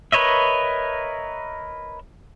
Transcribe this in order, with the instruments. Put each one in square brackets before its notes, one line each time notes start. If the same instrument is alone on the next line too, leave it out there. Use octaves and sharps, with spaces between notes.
[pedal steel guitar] A#4 B4 C#5 D#5 E5